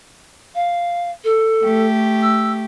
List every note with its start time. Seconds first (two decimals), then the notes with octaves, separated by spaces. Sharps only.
0.55 F5
1.24 A4
1.61 A3 G4
2.22 E6